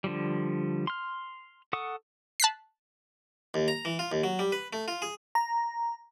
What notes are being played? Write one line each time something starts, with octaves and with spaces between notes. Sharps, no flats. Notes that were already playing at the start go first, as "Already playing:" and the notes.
D3 F3 G3
C6 F6
A4 F#5 C#6 D#6
A5 F#6 B6 C7
D#2
A#5
E3
F4
D#2
F#3
G3
B4
A3
F4
G#4
A#5